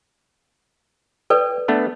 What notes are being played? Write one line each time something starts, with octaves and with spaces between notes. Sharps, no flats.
A4 B4 D5 G5
A3 B3 D4